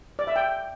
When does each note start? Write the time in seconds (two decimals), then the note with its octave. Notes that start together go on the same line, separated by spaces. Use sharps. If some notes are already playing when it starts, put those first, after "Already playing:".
0.19 D5
0.27 E5
0.36 G5